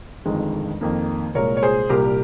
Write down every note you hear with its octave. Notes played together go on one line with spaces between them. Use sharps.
G1 F2 D#3 G#3
F2 D#3 A#3
C2 A#2 G#3 A#4 C#5
C#5
G#4 C5
C2 A#2 G3 G4 A#4